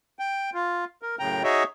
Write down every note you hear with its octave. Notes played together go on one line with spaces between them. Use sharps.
G5
F4
A#4
F#2 A2 C#3 G5 A#5
D#4 F#4 G#4 C#5 D#5 E5